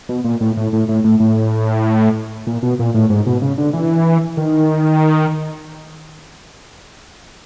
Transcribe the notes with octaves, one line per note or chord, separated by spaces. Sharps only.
B2
A#2
A2
A2
A2
A2
A2
A2
A#2
B2
A#2
A2
G#2
B2
C#3
D3
E3
D#3